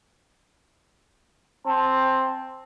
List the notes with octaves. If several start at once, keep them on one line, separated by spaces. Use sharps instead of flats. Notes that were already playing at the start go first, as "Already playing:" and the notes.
C4 C5 A5